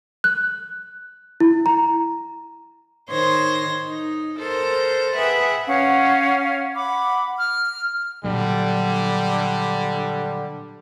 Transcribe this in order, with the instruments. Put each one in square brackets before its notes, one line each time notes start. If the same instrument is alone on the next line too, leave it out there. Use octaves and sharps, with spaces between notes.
[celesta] F#6
E4
A#5
[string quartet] D#3 C5 C#5 C6 A#6
D#4
A4 A#4 C5
G#4 B4 E5 F#5 G5
[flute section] C#4 C#5 F5 F#5
F#5 B5 D6
F6
[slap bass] A#2 F#3 [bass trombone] D3 [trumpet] G3